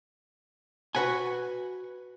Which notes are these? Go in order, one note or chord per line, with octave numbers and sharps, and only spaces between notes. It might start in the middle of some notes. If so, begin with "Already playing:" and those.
F#4 B4 F#5 G#5